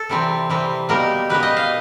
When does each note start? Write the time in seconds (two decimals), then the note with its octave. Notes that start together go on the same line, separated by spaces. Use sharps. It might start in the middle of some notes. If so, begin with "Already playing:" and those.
Already playing: A4
0.09 C3 E3 G3 C4
0.49 C3 E3 G3 C4
0.89 B2 G3 A#3 D#4 A#4
1.29 B2 G3 A#3 D#4 B4
1.43 D#5
1.57 F5